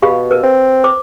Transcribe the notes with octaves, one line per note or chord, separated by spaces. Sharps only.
B2 G4 F5 B5
A#4 B4
C4
C5 D6